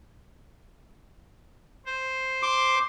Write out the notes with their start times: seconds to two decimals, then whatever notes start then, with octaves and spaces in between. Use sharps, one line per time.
1.86 C5
2.43 C6 D6